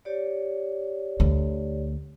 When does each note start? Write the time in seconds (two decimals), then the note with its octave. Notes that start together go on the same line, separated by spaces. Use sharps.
0.05 G4 C#5 D5
1.20 D2